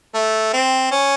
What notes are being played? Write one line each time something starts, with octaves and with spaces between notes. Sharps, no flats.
A3
C4
C#4